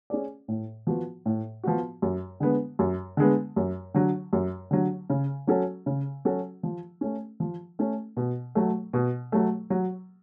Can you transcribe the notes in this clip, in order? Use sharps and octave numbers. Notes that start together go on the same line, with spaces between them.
C#4 G#4 D5
A2
F3 B3 F#4
A2
F3 B3 F#4
F#2
D3 G#3 B3
F#2
D3 G#3 B3
F#2
D3 F#3
F#2
D3 F#3
C#3
F#3 C#4 F#4 A4
C#3
F#3 C#4 F#4 A4
F3
A3 C#4
F3
A3 C#4
B2
F#3 A3
B2
F#3 A3
F#3